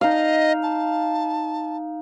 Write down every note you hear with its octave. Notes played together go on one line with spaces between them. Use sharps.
D#4 D#5 F5
A5